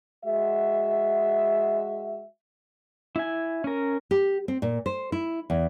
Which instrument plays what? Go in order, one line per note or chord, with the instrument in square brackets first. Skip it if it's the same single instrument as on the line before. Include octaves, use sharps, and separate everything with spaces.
[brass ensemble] G#3 F#4 E5
[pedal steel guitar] E4 G#5
C#4 A#4
[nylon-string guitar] G4
C4
A#2
C5
E4
E2